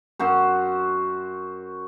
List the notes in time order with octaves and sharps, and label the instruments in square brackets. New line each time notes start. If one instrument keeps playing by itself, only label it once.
[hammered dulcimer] F#2 F#4 C5